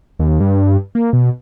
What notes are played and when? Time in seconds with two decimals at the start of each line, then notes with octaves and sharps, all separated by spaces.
0.19 D#2
0.40 G2
0.95 A#3
1.13 B2